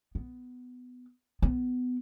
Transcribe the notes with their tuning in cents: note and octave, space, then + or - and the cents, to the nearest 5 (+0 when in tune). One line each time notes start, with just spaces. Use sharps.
B3 +15
B3 +20